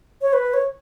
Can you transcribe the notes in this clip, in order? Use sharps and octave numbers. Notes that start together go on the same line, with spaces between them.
C#5
B4
C#5